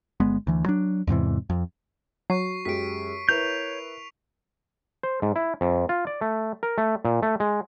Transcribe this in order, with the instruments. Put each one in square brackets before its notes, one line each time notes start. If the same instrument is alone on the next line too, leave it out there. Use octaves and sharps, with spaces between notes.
[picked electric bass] G1 G#3 B3
D2 E3
F#3 D4
E2 G#2 C3 E3
F2
[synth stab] F#3 [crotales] C#6 C7
[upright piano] F#2 G#3 G4 [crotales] B6 D7
[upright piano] E4 A#4 B4 [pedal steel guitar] C#5 G6 [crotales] F7
[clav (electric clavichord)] C5
G#2
E4
F2
F4
D5
A3
A#4
A3
A#2
A3
G#3